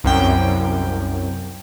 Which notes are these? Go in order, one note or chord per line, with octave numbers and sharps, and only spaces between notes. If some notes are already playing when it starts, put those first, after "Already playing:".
C2 F#2 G5